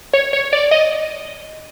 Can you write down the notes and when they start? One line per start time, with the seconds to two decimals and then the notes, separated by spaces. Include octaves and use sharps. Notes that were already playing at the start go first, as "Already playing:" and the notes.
0.13 C#5
0.33 C#5
0.53 D5
0.71 D#5